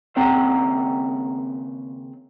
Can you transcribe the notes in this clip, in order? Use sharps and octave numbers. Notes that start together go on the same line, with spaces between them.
D#2 C#3 C4 F#5 G5 A#5